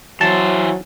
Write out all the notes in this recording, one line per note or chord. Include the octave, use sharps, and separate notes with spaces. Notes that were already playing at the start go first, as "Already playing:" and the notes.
E3 F#3 C5 A5